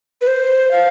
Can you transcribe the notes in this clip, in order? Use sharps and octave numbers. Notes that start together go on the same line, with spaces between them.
B4
C5
F5